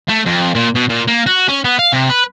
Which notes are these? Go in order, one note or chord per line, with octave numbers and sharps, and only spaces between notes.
A3
F2
A#2
B2
A#2
A#3
F#4
C#4
B3
F5
C3
B4